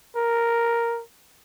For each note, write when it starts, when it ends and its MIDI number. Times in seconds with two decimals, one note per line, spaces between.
0.16 1.02 70